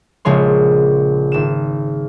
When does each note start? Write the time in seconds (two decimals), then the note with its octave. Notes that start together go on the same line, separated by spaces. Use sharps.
0.25 A#1 C#3 G#3 C#5 C6
1.32 G#1 E7